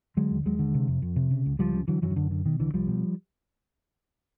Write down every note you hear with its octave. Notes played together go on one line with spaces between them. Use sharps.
D3 F#3 G#3
D#2
D#2 F#3 G#3
D3
C3
F2
F2
C3
C#3
C#2
C#2 F3 G3
C#3
D3 E3 F#3
F#2 E3 F#3
D#3
F#2 D3
D3
B2 D#3
C2 D3 E3
C2 F3 G3
B2